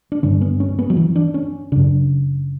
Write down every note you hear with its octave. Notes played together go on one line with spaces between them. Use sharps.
D4
G2 D3 C#4
B3
C#4
B3
F#3
E3
D4
C#4
F#2 C#3 D4